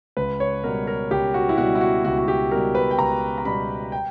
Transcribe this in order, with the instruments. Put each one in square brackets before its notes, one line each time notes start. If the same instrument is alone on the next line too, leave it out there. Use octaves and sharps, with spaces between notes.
[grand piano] C#2 B4
C#5
B2 G3 A#4
A#4
C#2 G4
F#4
E4
B2 G3 F#4
E4
F#4
C#2 F#4
F#4
G4
B2 G3 A#4
B4
G5
C#2 A#5
A#5
B2 G3 B5
G5